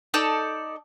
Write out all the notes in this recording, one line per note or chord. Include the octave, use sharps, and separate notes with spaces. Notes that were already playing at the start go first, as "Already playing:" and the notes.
D#4 A4 D5